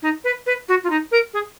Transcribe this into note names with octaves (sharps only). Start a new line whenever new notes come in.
D#4
B4
B4
F#4
F4
D#4
A#4
G#4